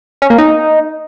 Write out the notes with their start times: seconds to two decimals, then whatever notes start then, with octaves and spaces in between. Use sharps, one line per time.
0.22 C#4
0.30 A#3
0.38 D#4